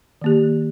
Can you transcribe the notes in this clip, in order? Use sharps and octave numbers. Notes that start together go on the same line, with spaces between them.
D#3 A#3 G4